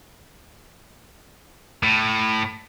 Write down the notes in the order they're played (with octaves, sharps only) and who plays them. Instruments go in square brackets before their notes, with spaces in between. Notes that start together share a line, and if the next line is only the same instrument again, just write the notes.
[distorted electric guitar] A2